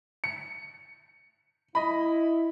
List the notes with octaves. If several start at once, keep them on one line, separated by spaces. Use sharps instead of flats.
C#7
E4 D#5 B5